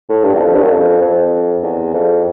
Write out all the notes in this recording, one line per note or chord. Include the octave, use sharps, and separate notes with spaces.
A2
G2
E2
F2
G2
F#2
F2
F2
E2
F2